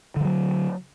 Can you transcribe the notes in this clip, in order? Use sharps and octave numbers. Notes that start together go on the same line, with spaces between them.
D3 F3 F#3